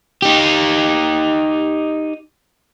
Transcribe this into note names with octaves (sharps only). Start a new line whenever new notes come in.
D#4 G4